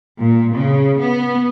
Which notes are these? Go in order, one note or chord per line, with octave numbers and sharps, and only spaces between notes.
A#2
C#3
B3